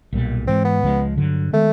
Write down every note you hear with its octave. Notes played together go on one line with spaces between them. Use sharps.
B1 A#2 G3
G#2 E3 G#3 C4
B3
C#2 C#3 F3 G#3
G2 D3 F#3
D#3 G#3 A3 B3